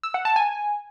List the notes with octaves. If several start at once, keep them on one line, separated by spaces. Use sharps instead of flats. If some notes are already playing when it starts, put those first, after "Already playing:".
E6
F#5
A5
G#5